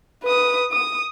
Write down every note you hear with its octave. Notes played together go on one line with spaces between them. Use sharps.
B4 D#6
D#6